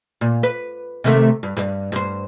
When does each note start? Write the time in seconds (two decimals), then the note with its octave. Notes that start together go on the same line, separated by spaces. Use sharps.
0.21 A#2
0.43 B4
1.04 C3 D#3 A3
1.43 G2
1.57 G2
1.92 G2 C5